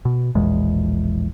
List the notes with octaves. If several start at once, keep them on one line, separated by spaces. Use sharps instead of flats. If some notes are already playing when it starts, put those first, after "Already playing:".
B2
E1 A#1 E2 G#3